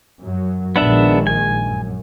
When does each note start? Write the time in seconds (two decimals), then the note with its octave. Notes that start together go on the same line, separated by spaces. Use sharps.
0.21 F#2 F#3
0.76 A#1 D#3 G#3 B3 D4 E5
1.27 G#5
1.65 F#2